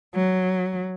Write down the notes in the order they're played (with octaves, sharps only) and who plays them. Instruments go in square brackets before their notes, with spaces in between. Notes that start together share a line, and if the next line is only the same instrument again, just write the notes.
[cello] F#3